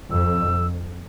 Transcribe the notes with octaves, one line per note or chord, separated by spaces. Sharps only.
F2 E6